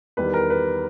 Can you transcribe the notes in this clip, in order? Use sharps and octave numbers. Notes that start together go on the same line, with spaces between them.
E2 D#3 G3 B4
A#4
B4